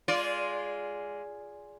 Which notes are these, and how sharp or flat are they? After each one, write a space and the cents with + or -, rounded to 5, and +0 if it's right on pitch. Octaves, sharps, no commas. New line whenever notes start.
G#3 +0 F4 +0 D5 -20